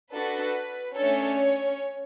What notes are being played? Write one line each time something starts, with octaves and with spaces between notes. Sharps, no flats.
D4 F#4 A4 B4
A3 C#4 D4 A4 C#5